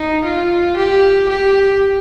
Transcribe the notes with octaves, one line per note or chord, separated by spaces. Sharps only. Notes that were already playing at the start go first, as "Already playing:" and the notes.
Already playing: D#4
F4
G4
G4